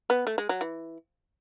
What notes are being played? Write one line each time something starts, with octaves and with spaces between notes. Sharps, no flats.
B3
A3
G#3
F#3
E3